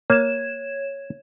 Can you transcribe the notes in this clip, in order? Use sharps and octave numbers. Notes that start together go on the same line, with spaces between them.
A#3 C#5 G#6 E7